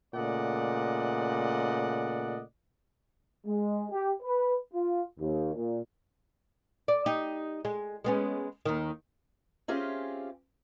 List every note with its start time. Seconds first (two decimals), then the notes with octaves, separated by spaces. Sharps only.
0.15 A#2 C#3 A3 D5 D#5 F#5
3.47 G#3
3.91 G4
4.23 B4
4.73 F4
5.20 D#2
5.55 A#2
6.88 D5
7.06 D#4 G4
7.65 G#3
8.04 G#3 B3 C#4
8.65 D#2 D#3
9.68 C4 C#4 F4 G4 G#4 E5